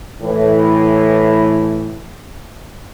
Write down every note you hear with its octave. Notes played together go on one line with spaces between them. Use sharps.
A2 E3